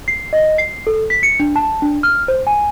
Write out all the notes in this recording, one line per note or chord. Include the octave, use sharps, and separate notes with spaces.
C7
D#5
C7
A4
B6
C#7
D4
A5
D4
F6
C5
G#5